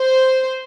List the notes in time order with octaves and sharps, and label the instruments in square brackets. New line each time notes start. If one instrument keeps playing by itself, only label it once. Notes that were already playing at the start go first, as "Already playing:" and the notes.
Already playing: [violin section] C5